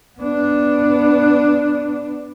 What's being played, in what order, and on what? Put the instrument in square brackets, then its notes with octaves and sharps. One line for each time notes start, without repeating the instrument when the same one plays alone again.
[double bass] B3 D4